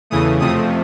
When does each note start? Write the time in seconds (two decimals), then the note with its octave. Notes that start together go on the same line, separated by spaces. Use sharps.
0.10 E2 C#3 E3 A3 D#6
0.40 F2 C3 F3 A3 D#6